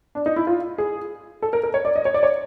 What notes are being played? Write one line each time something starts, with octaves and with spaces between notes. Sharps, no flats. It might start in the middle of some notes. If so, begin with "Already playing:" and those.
D4
D#4
E4
F4
G#4
A4
A#4
A#4
C#5
D5
D#5
C#5
D5
C#5